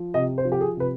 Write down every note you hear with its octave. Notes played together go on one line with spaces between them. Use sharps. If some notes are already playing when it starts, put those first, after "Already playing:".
Already playing: F3
C3 D#5
C5
F3
G4
G#4
C3 B4